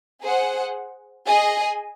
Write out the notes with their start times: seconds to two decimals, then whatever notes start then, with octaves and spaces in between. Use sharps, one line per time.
0.23 G#4 C5 F#5
1.26 G#4 D#5 G#5